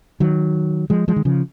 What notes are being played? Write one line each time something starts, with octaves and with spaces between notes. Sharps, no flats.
D#3 F#3
F3 G#3
F3 G#3
D#3
C#3 F3